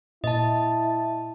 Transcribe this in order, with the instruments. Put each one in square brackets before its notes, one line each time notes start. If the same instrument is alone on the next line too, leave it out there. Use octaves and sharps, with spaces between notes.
[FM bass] A#2 [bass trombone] E4 [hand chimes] D#5 A5